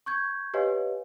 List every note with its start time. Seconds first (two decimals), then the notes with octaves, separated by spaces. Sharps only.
0.06 C#6 G6 G#6
0.54 G4 B4 C#5 D#5 F5 G#5